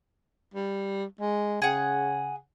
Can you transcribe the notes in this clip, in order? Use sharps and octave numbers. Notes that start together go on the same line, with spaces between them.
G3
G#3
C#3 G#4 F#5